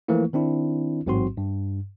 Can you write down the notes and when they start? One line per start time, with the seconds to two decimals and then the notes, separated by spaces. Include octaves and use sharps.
0.08 E3 F3 A3 A#3 E4
0.33 D#3 C4 D4 E4
1.06 A1 G#2 F#3 C4 F#4 C6
1.37 G2